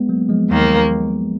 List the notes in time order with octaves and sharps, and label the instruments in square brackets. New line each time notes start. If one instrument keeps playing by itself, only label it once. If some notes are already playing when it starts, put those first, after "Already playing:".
Already playing: [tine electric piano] G#3 B3
F#3 A#3
F3 G#3
[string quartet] D#2 D#3 A#3